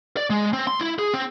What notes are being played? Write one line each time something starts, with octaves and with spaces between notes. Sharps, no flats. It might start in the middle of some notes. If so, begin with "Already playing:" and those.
D5
G#3
C4
C6
E4
G#4
C4